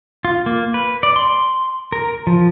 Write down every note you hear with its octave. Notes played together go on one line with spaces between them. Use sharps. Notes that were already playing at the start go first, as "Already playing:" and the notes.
F4
A#3
B4
D5
C6
A#4
F3